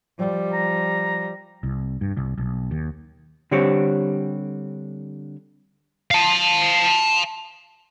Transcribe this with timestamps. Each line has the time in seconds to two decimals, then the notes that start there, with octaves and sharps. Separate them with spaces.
0.18 F3 G3
0.53 A#5
1.63 C2
2.01 G2
2.17 C2
2.38 B1
2.71 D#2
3.51 D3 G3 C4 G4 C#5
6.11 F5 A5